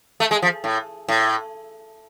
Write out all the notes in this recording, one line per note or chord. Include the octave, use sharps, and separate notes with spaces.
A3
G#3
F3
A2
A2